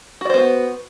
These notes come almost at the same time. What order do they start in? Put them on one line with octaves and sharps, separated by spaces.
F#4 D5 C5 B3